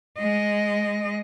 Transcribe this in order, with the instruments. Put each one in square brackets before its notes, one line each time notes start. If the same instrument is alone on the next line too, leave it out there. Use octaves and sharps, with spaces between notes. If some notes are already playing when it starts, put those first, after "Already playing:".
[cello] G#3 D#5